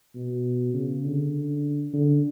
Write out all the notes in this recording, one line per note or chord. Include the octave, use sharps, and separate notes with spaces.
B2
C#3
D3
D3